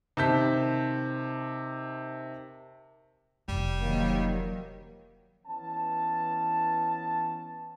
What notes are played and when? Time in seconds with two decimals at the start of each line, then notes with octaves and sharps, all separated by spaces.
0.17 C3 D#3 A5 G6 B6
3.48 F1 C3 G3
3.81 D#3 F3 F#3 A#3
5.47 E3 B3 C#4 A5